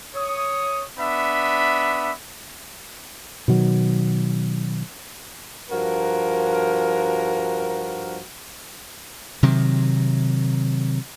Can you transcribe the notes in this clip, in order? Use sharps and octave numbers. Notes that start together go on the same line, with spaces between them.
C#5 D#6
B3 D4 E5 B5
B2 D#3 F#3
G2 F3 F#4 A#4
C3 D#3 F#3